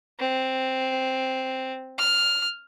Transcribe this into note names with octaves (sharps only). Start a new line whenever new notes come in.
C4
F6